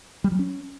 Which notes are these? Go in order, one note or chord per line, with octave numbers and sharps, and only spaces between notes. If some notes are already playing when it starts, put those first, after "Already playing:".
G3
F#3
C#4